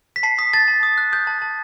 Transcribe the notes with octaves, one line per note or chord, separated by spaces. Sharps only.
B6
A5 C7
D#6 B6
A5 A6
A5
D#6
F#6
D#6 G6
A5
A5